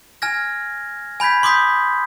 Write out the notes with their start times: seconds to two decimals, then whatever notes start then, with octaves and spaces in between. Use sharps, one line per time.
0.22 G#5 F6 G#6 A#6
1.20 G#5 B5 G6 G#6 B6
1.43 C6 D6 D#6 G6 B6